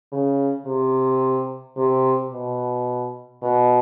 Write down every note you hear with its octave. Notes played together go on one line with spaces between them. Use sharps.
C#3
C3
C3
B2
B2